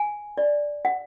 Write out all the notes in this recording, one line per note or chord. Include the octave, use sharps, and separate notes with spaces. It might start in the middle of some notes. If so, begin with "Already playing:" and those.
Already playing: G#5
D5
F#5